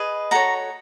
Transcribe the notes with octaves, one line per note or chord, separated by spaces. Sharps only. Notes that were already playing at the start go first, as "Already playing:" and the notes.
Already playing: G#4 B4 D#5
F#4 A4 C#5 A#5